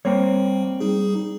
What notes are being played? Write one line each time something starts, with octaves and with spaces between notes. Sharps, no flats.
G3 A#3 C4 C#5 G5
G3 D#4 G#4